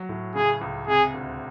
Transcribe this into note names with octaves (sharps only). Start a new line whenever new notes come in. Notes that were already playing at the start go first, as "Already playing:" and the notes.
Already playing: F#3
A2
C#3 G#4
C#2
C3 G#4
D2